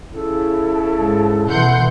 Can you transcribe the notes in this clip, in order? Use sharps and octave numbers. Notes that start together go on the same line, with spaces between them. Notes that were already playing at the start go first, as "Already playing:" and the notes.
C#3 E4 A4
G#2
B2 E3 F#5 C6 G6